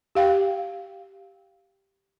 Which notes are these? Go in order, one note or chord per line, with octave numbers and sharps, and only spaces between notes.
G4 F5 G5